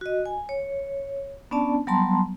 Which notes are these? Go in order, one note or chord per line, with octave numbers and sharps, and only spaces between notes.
F#4 D#5
G#5
C#5
B3 C#4 D4 D5 A5
F#3 G3 B3 A5 A#5 C6